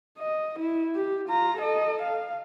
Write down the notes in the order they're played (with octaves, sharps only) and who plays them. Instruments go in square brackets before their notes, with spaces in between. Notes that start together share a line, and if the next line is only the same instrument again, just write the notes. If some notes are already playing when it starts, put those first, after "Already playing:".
[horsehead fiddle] D#5
E4
G4
F4 A#5
A4 D#5
F5